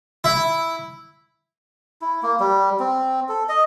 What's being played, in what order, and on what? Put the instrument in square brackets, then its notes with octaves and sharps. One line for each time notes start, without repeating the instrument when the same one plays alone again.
[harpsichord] E4
[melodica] E4
A#3
G3
C4
A4
D#5